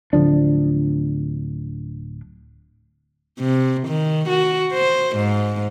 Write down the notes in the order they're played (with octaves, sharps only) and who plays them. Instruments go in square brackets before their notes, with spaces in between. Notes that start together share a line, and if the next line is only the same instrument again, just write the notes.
[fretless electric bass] D1 D3 F3 D4
[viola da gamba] C3
D#3
F#4
C5
G#2